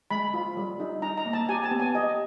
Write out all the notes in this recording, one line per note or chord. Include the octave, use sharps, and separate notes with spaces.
G#3 B5
F4
G3
D#4
D#4 A#5
A#5
A#3
A5
G4 G#5
A5
B3
G#5
G4 D#5